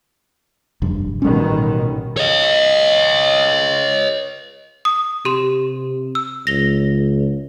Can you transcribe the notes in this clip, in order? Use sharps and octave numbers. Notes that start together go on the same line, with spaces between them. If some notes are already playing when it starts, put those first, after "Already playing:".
F1 G2
A1 B2 D#3 G3 C#4
C#5 D#5
D#6
C3 G4 C6 E7
E6
C#2 A#6 F7 G7